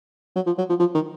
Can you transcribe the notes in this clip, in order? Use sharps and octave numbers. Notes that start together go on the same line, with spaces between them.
F#3
F3
F#3
F3
F3
D#3